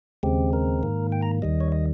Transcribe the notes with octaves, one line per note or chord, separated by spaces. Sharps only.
D#2 C#3 G#3 C4 G4
A#4
G#2 D#3 A#3
G5
A#5
D#2 D#3 G3 D#5
C#5
D#5